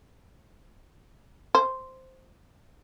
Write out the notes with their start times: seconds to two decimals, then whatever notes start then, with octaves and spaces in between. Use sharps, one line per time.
1.55 C5